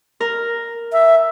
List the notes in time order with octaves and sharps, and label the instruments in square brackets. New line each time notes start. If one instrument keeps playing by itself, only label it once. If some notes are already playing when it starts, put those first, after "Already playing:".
[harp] A#4
[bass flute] E5